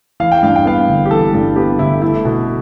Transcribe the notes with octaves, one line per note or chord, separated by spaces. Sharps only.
E3 F5
G5
G2 F5
G5
B3 F5
G1
G4
E3 A4
G2 A4
B3 G4
G1 E4
A3 E4
B2